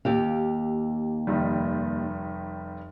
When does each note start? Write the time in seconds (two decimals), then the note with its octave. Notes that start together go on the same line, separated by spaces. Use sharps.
0.05 D#2 G4 F5
1.27 F1 D#3 G3